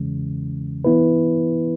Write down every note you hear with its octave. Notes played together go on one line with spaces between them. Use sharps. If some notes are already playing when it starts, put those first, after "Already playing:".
Already playing: E2 C#3 E3 G#3 C#4
E3 B3 E4 B4